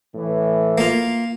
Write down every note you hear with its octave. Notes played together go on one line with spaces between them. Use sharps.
A2 E3
A#3 F4